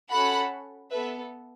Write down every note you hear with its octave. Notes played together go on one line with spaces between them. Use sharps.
C#4 F#4 A4 F#5 B5
B3 A4 B4 E5